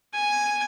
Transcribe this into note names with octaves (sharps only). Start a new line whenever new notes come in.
G#5